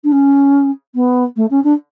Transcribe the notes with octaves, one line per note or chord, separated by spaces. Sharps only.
D4
C#4
B3
A3
C#4
D4